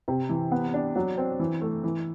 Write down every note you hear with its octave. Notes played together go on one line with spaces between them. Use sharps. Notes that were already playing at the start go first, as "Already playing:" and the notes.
C3
E3
B3
D4
F#3
C4
E3
A3
E3